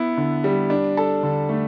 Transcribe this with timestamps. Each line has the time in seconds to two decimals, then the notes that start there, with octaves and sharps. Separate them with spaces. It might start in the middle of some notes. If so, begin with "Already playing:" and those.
Already playing: B3 E4
0.17 D3
0.44 G3
0.70 D4
0.97 A4
1.23 D3
1.49 A3